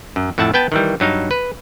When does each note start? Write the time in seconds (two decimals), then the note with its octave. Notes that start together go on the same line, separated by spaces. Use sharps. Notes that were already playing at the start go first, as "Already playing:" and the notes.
0.16 F#2
0.38 F2 A2 E5 F#5 A5
0.54 B3 B4 G5 A5
0.72 D#3 E3 G3
1.00 G2 F#3 D#4 F5
1.31 B4